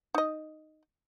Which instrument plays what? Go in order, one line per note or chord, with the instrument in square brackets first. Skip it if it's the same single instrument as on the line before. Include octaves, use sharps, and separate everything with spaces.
[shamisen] D#4 D#5